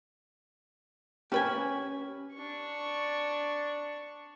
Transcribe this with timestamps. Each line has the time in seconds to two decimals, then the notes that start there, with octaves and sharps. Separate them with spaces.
1.32 C#4 G4 B4 G#5
2.33 D4 C#6